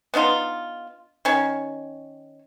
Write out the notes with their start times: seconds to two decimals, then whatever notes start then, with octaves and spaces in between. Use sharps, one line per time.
0.14 B3 D4 D#4 F4
1.25 D#3 C#4